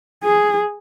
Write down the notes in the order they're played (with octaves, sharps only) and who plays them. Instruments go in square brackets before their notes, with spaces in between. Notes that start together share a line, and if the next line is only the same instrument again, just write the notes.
[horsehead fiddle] G#4